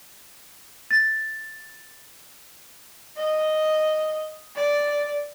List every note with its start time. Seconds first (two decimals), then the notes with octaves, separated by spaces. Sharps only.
0.91 A6
3.17 D#5
4.56 D5